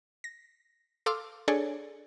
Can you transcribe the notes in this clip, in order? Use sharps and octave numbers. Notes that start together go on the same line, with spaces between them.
A#6
A4 F5 C6 D6 E6 F6
D4 G#4 A4 C#5 D5 G#5